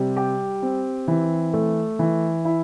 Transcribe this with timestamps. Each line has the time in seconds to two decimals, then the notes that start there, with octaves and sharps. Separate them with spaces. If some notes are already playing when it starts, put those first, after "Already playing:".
Already playing: C3 G3
0.16 G4
0.62 C4
1.08 E3
1.53 A3
1.99 E3
2.45 E4